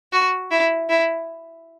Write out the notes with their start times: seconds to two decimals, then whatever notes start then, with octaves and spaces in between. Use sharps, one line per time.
0.13 F#4
0.51 E4
0.89 E4